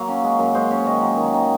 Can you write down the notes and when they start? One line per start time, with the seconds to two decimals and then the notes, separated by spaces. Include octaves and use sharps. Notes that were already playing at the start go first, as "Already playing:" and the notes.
Already playing: F#3 A#3 F5
0.09 C#4
0.24 G#3
0.39 F#2
0.54 G#3 C5
0.71 C#4 C#5
0.87 D#3 D#5
1.02 F#3
1.17 D#3
1.34 D#3